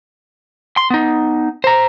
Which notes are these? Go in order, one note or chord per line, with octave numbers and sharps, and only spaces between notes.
C6
B3 D#4
C5 A#5